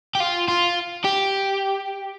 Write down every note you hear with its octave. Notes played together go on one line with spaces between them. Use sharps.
G4
F4
F4
G4